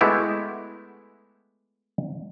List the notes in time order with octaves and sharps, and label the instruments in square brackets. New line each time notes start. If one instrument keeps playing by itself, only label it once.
[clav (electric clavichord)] G#3 A3 B3 E4 F#4 G4